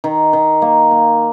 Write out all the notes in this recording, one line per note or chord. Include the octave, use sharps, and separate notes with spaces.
D#3
D#3
A#3
A#3